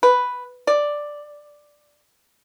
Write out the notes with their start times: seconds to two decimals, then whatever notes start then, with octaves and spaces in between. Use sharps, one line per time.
0.03 B4
0.67 D5